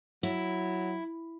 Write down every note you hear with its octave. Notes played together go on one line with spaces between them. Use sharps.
F#3 E4